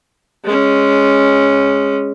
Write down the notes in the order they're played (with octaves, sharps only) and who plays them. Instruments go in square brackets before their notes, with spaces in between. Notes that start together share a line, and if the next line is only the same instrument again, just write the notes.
[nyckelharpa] G#3 C#4